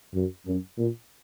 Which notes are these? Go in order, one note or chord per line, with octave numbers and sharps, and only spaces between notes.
F#2
F#2
A#2